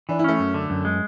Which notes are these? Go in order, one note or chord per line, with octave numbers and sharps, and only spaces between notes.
E3 D4
E4
A3 C#4
F#2
D3
F#2
G#3